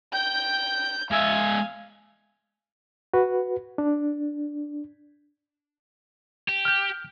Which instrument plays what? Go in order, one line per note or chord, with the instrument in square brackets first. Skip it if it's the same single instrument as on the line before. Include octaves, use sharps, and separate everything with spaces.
[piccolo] G5 [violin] G6
[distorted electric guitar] G#3 E5 [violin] F5 [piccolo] G#5
[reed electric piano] F#4 B4
D4
[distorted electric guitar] G4
[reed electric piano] F6 G6